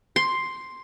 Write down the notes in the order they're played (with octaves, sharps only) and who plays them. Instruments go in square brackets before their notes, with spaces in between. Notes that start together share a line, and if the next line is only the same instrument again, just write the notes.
[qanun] C6